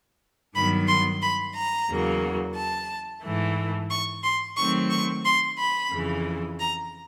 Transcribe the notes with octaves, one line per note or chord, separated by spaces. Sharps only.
G2 D#3 F#3 B3 B5
C6
B5
A#5
E2 C#3 F#3 A#3
A5
G#2 E3 A3
C#6
C6
D#3 F#3 A3 C4 C#6
C#6
C6
B5
F2 C#3 E3
A#5